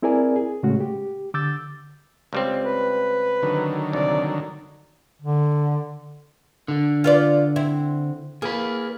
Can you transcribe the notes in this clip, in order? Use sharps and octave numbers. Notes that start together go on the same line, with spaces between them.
C4 E4 G#4 A#4 D5 G#5
G#4
A2 C#3 G#3 A3 C#4 F#4
G4
D3 D6 E6 G6 A6
C#2 G3 C4
B4
D3 D#3 F#3
C2 D5
D3
D3
F4 B4 D5
C4 E4
A#3 G#4 B4